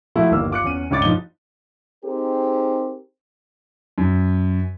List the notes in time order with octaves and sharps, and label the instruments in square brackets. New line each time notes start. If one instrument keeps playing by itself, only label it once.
[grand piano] F3 A3 E4 F#4 A4
G1 D#2 A#3 E6
F4 D6 F#6 C#7
E2 C#4 D#7
C#2 G2 C#5 D6 A6
D1 F3 D#4 G7
[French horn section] C4 D#4 G4 G#4 A#4
[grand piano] F#2